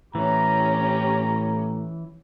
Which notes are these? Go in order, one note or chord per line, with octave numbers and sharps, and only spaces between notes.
A2 E3 C#4 G4 A#5